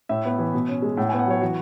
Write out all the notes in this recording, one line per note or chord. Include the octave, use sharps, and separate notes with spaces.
A2 E5
B3
E3
B2
C#4
G#3
A2 F#5
B3 G#5
F#5
F#3 C#5
E3 F#4